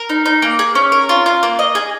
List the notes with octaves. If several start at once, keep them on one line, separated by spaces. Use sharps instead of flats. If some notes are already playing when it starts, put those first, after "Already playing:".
Already playing: A#4
D#4
D#4
A#3
G#4
C#4
A#4
F4
F4
A#3
D#5
G#4